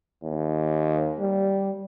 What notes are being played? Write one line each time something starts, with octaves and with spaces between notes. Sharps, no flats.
D#2
G3